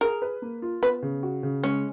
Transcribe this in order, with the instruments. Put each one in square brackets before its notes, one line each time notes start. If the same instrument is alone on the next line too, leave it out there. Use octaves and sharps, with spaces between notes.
[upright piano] G#4 [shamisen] A#4
[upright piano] B4
A#3
F4
[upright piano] B3 [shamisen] B4
[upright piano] C#3
F#4
C#3
[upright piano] G#3 [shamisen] C#4